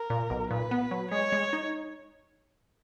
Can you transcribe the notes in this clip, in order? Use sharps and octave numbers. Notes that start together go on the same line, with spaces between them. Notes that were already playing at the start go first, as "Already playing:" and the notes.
Already playing: A#4
A#2
B1
A#2 B4
B3
F#3
G#3 C#5
G#3
D#4